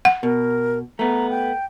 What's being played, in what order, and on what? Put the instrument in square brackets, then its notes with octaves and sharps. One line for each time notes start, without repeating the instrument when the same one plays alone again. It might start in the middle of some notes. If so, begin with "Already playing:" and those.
[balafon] F#5
[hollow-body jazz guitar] B2 [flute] A#4
[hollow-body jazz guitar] A3 B3 [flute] A#5
[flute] G5